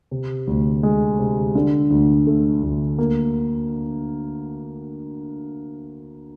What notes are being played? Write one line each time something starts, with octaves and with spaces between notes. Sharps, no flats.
C3
D2
G#3
C3
D3
D2
A3
D2
A#3